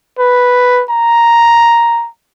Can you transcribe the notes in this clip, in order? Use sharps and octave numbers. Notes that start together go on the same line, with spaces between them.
B4
A#5